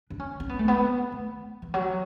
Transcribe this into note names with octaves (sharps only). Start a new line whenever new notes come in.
D4
C#4
C#4
B3
A3
B3
A3
E3
F#3